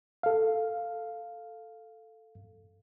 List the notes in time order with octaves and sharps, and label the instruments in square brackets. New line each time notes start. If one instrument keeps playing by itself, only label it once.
[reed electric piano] A4 F5